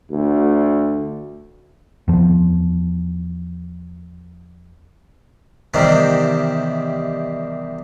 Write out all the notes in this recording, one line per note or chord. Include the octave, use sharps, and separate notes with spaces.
D2
E2 F3
E2 C3 D#3 G3